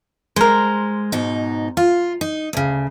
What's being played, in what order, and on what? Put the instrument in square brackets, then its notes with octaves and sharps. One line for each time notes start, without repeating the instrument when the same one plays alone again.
[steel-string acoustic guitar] G#3 [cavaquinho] A#4 C5
[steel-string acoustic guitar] G#2 B2 D#4
F4
D#4
D2 C#3